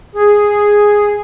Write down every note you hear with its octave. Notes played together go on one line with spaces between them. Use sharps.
G#4